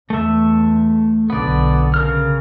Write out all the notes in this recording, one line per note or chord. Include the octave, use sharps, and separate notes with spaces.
E2 A3 E5
B1 D3 B3 D5
C#3 A#4 F6